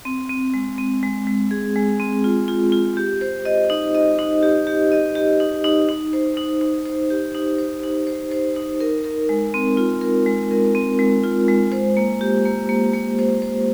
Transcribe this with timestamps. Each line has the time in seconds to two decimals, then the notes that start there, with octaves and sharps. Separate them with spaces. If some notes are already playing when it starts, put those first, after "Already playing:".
0.05 C4
0.30 C4
0.54 G#3
0.78 C4
1.03 G#3
1.27 G#3
1.51 G#4
1.76 G#3
2.00 C4
2.24 F4
2.48 F4
2.72 F4
2.97 G4
3.21 C5
3.45 D#5
3.70 D#4
3.95 D#5
4.19 D#4
4.43 G4
4.67 G4
4.92 D#5
5.15 G4
5.40 D#4
5.64 D#4
5.89 D#4
6.13 C5
6.37 D#4
6.61 D#4
6.85 C5
7.10 G4
7.35 D#4
7.58 C5
7.83 D#4
8.07 C5
8.32 C5
8.56 D#4
8.80 A#4
9.04 A#4
9.29 G#3
9.54 C4
9.77 F4
10.01 A#4
10.26 G#3
10.51 A#4
10.75 C4
10.99 G#3
11.23 F4
11.48 G#3
11.72 C5
11.97 A#3
12.21 G4
12.45 A#3
12.69 A#3
12.93 A#3
13.19 C5
13.42 C5